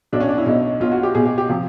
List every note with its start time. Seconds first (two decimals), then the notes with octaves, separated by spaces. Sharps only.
0.12 B1 B2 D4
0.20 C#4
0.28 D4
0.38 E4
0.46 B1 B2 D#4
0.80 B1 B2 F4
0.91 F#4
1.03 G4
1.15 B1 B2 G#4
1.26 G4
1.38 G4
1.49 C3 F3 G4